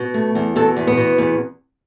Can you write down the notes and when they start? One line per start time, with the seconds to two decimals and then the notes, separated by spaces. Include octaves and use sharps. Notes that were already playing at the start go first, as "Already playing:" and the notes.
Already playing: B2
0.14 A3
0.35 E2
0.56 B2 A4
0.76 E2
0.87 B3
0.97 B2
1.18 E2